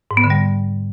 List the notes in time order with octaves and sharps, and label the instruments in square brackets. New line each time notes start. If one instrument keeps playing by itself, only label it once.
[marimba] G#2
B3
D3
G3